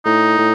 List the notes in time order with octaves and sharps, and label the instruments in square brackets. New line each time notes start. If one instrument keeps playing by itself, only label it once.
[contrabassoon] A2 [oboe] D#4
[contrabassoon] A2